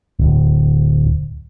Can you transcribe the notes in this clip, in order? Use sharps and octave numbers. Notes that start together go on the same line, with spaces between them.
D1